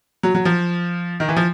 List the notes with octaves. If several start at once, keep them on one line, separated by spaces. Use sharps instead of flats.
F#3
F#3
F3
D#3
E3
F3